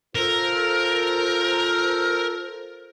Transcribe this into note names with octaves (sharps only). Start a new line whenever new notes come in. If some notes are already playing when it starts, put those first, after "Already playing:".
F4 A4 A#4 C5